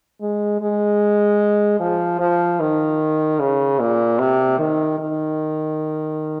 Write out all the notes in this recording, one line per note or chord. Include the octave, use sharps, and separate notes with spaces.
G#3
G#3
F3
F3
D#3
C#3
A#2
C3
D#3
D#3